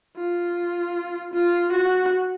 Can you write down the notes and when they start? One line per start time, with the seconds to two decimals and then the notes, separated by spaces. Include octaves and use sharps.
0.17 F4
1.34 F4
1.72 F#4